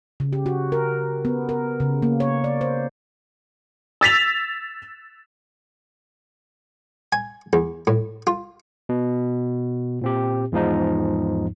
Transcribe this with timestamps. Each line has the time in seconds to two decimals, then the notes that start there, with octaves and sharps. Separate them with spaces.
0.20 C#3
0.33 G4
0.46 F#4
0.72 A#4
1.25 B3
1.49 A#4
1.80 C#3
2.02 A#3
2.20 C#5
2.44 D5
2.61 C5
4.01 E6 A6 B6 F7
7.13 G#5
7.53 E2
7.87 A2
8.27 F4
8.89 B2
10.02 A#2 C4 G4
10.52 E2 G#2 F3 D#4